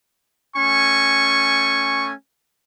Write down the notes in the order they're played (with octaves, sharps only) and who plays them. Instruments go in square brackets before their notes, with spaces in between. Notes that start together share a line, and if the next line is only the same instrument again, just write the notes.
[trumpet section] A3 C#4 G#5 C#6